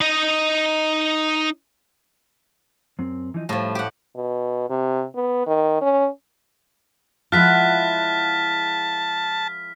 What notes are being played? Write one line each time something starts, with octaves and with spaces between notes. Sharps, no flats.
D#4 D#5
F#2 C4
E3 F3 D#4
A2 F3 G3 A3
G4 F#5
B2
C3
B3
D#3
C#4
F3 G#3 E4 F4 F#5 A5 F6 B6